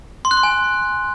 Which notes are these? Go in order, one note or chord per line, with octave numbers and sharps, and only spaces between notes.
C6
F#6
C6
G#5